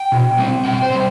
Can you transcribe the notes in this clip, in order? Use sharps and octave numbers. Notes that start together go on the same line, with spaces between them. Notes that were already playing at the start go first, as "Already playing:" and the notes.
Already playing: G5
B2
G3 C4
B2 G5
C5
G3 C4